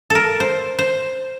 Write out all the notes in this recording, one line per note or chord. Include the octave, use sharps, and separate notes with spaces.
A4 A#4
C5
C5